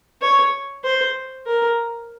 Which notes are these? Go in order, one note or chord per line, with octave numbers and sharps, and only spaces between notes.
C#5
C5
A#4